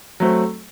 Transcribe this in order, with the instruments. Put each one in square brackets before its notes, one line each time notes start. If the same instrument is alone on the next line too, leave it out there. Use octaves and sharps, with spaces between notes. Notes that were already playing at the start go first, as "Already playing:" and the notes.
[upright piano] F#3 A3 C4